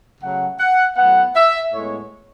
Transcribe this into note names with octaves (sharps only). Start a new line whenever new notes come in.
C#3 F#3 A3 F#5
F#5
A2 F#3 B3 F#5
E5
A2 G#3 B3 C#5